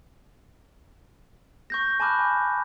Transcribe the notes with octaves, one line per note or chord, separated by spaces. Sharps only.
C#6 G6 A#6
G#5 A5 B5 D6 F6 F#6